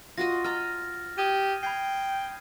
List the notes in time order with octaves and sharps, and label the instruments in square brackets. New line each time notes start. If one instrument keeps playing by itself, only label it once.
[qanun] F4 F#4 D#5 [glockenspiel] A#6
[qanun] D#5 A#5 [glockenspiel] F6 A6
[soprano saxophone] G4 [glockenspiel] D#6 G#6 D#7
[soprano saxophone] G5 [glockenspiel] B5 G#6 C7